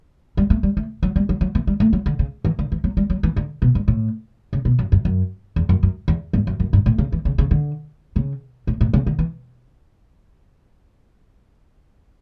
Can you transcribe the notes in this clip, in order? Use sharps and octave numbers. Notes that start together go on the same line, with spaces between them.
G3
A3
G3
A3
F#3
G3
F#3
F#3
E3
G3
A3
F#3
D3
C#3
E3
D3
E3
F#3
G3
F#3
E3
D3
B2
G2
A2
C#3
B2
F#2
F#2
F#2
E2
F#2
F#2
E2
G2
F#2
F#2
G2
A2
C#3
E3
C#3
C#3
D3
C#3
A2
A2
C#3
D3
E3